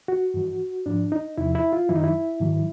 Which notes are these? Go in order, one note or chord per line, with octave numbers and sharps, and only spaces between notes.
F#4
G2 E3
G#2 F3 D4
D#4
E2 C3 F3 E4
E4
F4
F#2 D#3 F#3 E4
D#4
E4
G#2 D#3 F#3